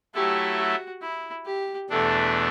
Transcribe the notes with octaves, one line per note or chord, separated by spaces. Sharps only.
F#3 A3 E4 G4 A4
F#4
E4
G4
E2 B2 A3 D4 A4